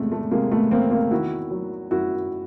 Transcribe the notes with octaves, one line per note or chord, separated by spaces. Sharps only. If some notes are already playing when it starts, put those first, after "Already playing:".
Already playing: E2 C3 G#3 A3
A3
C3 G#3 A#3
A3 B3
E2 A#3 C4
A#3 C4
D#3 E4 F#4
F#3
F#2 E4 F#4